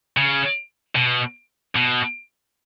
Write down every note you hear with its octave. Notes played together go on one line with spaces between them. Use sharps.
C#3
B2
B2